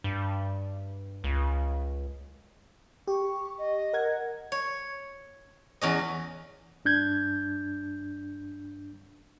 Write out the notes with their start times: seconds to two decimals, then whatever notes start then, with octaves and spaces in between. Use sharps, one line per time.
0.04 G2
1.24 C#2
3.08 G4 C#6
3.58 D#5
3.93 A#4 F#5 G#6
4.52 C#5
5.81 E2 C#4 D#5
6.85 G2 D4 G6 G#6